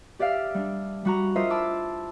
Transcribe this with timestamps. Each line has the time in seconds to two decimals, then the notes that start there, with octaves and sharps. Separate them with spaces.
0.19 G4 D5 E5 F5 F6
0.54 G3 D4
1.05 G3 F#4 A#5
1.36 F4 A#4 C5 D#5 E5
1.50 E4 A5 D6 E6